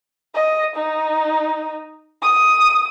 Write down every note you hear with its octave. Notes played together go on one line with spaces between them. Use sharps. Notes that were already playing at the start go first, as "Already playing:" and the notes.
D#5
D#4
D#6